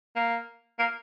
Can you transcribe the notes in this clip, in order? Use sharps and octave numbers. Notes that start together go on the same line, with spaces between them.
A#3
A#3